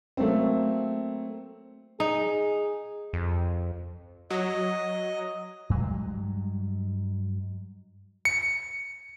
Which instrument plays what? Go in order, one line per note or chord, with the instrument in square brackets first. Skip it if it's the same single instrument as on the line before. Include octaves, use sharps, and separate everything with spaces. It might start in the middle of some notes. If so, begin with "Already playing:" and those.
[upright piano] F#3 A3 A#3 C4
[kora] D#4 [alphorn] G#4
[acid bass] F2
[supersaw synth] F#3 [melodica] D#5
[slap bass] G2 F#3 G#3
[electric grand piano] C#7